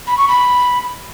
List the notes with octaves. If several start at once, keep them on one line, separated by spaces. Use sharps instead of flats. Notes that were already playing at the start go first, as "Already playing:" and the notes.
B5
C#6
B5